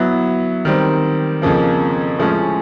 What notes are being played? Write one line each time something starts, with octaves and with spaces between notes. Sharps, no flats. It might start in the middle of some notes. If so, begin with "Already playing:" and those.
Already playing: F#3 B3 E4
D#3 G3 C4
F2 C#3 F3 A#3
A2 F3 G#3 C#4